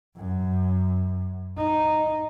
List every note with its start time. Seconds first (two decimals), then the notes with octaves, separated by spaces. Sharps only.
0.18 F#2
1.57 D#4